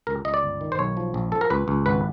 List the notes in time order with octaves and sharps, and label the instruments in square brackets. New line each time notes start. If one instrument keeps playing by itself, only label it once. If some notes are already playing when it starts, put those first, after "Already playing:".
[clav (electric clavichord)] C#2 A#4
C#2 D#5
D5
G1
D#3
C5
B1 C#5
F3
A#1
F3 A4
A#4
C#2 B4
C#2
G#1 B4